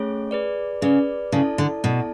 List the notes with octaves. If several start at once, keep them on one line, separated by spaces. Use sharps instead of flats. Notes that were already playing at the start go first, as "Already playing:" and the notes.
Already playing: A3 C#4 G#4 C#5
G#4 B4 D5
C#3 G#4 B4 D5
C#3 E4 A4 D5 A5
D3
B2 E4 A4 D5 A5